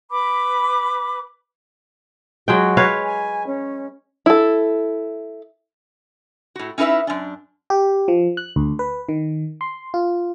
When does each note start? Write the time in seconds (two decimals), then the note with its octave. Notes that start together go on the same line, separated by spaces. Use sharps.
0.10 B4 B5 D6
2.48 F#3 G#3 F#4 G5
2.77 B4 C#5 F5
3.04 G#5
3.47 C#4
4.26 E4 A4
6.56 A2 F#4
6.78 C#4 D#4 E4 B4 E5
7.07 F#2 D4
7.70 G4
8.08 F3
8.37 F#6
8.56 D2
8.79 B4
9.09 D#3
9.61 C6
9.94 F4